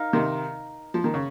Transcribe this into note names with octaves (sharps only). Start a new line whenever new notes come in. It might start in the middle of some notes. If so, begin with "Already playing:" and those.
Already playing: D#4 A#4 F5
C3 D#3
F3
D#3
C#3